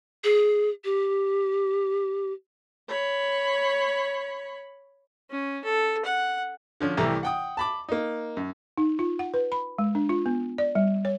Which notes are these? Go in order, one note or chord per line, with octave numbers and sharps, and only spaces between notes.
G#4
G4
C#5 B5
C#4
A4
F#5
D3 F3 C#4
C2 E3 A3 G4 A#5
F#5 G5 D#6
A5 B5 D6
A#3 D#4
F#2
D#4
F4
F#5
B4
B5
G#3
D4
F4
B3
D5
G3
C#5